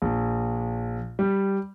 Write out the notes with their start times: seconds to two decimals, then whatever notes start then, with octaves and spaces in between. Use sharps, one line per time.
0.02 A#1
1.19 G3